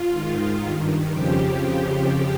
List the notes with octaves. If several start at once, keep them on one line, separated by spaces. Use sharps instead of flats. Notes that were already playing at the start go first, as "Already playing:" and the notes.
Already playing: F4
G#2 D#3
G2 D#3
F2 C#3 F3 G4